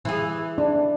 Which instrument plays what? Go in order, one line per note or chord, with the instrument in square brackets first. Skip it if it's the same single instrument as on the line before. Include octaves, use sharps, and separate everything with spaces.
[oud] E3 G#4
[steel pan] D4